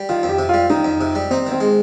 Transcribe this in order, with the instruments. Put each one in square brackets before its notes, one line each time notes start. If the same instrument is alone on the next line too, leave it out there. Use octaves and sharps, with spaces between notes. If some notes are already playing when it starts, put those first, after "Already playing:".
Already playing: [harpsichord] G3
[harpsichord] D#3 [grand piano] F4
[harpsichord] F2
[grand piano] G4
[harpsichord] C3
[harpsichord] G3 [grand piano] F4
[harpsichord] D#3 [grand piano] D#4
[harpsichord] F2
C3
G3
[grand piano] C4 [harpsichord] D#4
[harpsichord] D#3
[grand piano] C4
[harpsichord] G#3